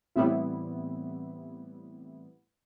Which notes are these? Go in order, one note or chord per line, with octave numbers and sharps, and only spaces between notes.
A2 E3 G3 B3 C4 E4